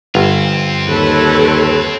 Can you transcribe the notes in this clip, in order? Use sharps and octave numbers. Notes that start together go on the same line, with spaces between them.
G1 C4 F4
D#2 A4 B4 C#5